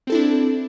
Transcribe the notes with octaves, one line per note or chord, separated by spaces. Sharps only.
C4 D4 E4 A4